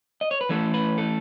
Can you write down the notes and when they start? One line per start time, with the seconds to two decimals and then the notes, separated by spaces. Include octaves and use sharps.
0.21 D#5
0.31 C#5
0.41 B4
0.49 E3 A3 C#4 A4
0.74 B4
0.98 A4